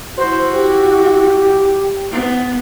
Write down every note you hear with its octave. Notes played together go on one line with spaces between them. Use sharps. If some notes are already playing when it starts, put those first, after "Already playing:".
E4 F#4 C5
G4
B3